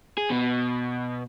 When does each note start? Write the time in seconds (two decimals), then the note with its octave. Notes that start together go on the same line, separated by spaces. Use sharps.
0.18 G#4
0.30 B2